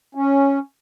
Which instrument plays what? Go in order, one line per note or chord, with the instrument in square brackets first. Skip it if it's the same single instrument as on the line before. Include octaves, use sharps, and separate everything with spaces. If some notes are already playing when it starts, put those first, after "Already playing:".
[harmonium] C#4